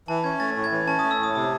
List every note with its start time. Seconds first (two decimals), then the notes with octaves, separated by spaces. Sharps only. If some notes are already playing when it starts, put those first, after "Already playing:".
0.08 E3 A5
0.24 C#4 G#6
0.40 A3 A6
0.56 A2
0.64 G#6
0.71 E3
0.87 C#4 A5
0.99 D#6
1.04 A3
1.11 E6
1.19 A2 D#6
1.35 C3 D#6